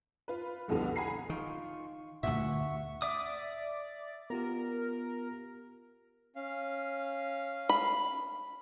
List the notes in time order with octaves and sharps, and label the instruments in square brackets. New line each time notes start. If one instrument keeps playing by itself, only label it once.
[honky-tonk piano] F4 B4
F1 C2 F2 B2 D3
F#5 G#5 A#5 B5 C7
[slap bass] D#3 [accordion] F4 C#6
[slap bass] D2 G2 A#2 [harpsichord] E5 [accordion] F#5 C#6
[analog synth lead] D5 [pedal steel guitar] E5 D6 D#6
[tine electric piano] B3 F4 G4 [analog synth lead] A#4
[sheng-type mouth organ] C#4 F5
[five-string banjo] B5